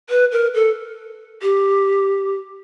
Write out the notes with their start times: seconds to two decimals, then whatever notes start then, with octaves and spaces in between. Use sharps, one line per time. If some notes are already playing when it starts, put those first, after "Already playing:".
0.10 B4
0.32 A#4
0.54 A4
1.42 G4